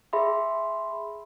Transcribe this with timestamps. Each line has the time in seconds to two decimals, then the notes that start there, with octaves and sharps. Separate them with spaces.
0.13 G#4 E5 B5 C6